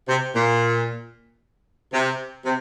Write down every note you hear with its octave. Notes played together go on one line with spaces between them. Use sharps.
C3
A#2
C3
C3